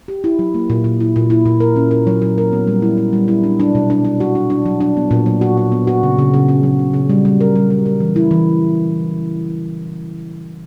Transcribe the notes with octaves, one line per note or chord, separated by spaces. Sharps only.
G4
E4
F#3
A#3
A#2
A#2
E4
A#2
E4
A#2
A#4
C#4
A#4
F#3
F#3
A#4
B3
G3
E4
E4
G3
E4
D4
D4
B2
D4
D4
F#4
D4
D4
F#3
D4
B3
A#2
F#3
F#4
F#4
B3
F#4
C#3
C#3
C#3
C#4
F#3
C#3
C#3
G3
G3
A#4
G3
A#4
A#4
E3
E4
E3